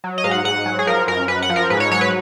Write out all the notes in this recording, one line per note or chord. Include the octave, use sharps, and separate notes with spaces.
F#3
D#5
G#2 F5
F#5
G#2 F#5
F#3
G#4
F3 A#4
F#2 A#4
F#2 B4
F#5
F3
A#4
G#2 B4
C#5
F#3 C#5
B4